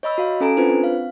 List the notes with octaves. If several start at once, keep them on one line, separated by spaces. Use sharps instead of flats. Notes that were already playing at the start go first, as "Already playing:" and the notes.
C#5 D#5 B5 E6
F#4 F5
C#4 A4 G#5 A#5 D7
C4 D4 F4 B4 C5
C4
F5